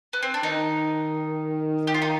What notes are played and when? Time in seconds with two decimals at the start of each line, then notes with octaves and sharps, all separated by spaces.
0.13 B3
0.22 C4
0.34 D4
0.43 D#3 D#4
1.87 G4
1.94 F4
2.02 D#4